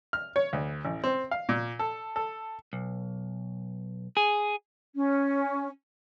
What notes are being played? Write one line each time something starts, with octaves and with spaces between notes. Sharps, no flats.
F6
C#5
D2
A1
C4
F5
A#2
A4
A4
B1
G#4
C#4